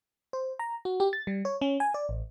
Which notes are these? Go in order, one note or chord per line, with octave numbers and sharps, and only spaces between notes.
C5
A#5
F#4
G4
A6
G3
C#5
C#4
G#5
D5
A1